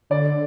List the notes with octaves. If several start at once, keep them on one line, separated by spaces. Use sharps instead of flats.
D3 D5